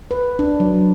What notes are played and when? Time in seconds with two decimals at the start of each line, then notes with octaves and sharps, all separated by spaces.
0.11 B4
0.39 D4
0.60 F#3